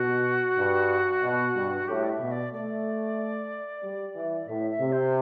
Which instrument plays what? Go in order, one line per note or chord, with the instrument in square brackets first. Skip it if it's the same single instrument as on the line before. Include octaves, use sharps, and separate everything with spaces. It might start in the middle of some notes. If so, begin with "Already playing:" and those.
Already playing: [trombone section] B2 [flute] F#4
[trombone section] G2
B2
G2
[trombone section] A2 [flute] G4
[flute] D5
E5
[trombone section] B2
[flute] D5
[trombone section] A3 [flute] D5
[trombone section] G3
E3
[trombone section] A2 [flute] E5
[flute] E5
[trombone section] C3
[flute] C5